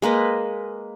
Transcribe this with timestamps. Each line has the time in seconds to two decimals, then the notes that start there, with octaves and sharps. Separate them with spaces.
0.02 G#3 A#3 B4 D#5